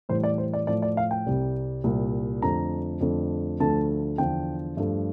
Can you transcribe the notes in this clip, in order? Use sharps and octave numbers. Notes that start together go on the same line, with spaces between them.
A2 E3 G3 C5
D5
C5
D5
A2 F3 A3 D5
D5
F5
G5
C2 C3 G3
C2 A#2 G3
F2 D3 A3 A#5
F2 D3 A3
D2 D3 F3 A3 A5
E2 D3 F3 G5
G2 F3 A3